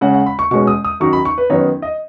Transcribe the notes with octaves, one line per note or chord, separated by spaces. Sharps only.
C#3 G#3 C#4 F#5
F#5
B5
C#6
B2 G#3 C#4 C#6
D#6
D#6
F#2 D#3 F#3 D#4 C#6
B5
C#6
B4
F#2 D#3 B3 D#4 C#5
D#5